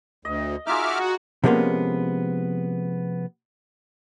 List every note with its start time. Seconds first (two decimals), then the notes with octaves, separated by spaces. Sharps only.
0.25 D2 D#5
0.67 D#4 F4 F#4 G#4 E5 D6 F6
1.44 C3 F3 G#3 A#3 B3 C#4